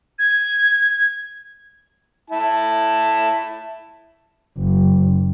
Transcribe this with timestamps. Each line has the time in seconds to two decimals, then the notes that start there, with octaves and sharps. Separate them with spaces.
0.19 G#6
2.30 E4 A5
4.57 F#1